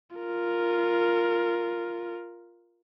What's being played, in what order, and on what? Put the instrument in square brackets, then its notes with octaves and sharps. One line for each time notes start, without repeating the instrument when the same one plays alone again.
[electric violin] F4 A#4